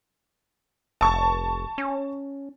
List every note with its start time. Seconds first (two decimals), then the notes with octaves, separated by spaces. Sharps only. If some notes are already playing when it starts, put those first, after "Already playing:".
1.01 F1 A5 C#6
1.78 C#4